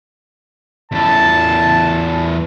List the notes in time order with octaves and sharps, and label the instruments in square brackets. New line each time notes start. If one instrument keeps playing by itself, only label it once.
[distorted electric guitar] E2 A4 [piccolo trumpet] A5